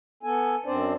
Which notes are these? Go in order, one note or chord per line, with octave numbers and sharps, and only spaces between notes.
B3 A4 G#5
F#2 C4 D4 C5 D5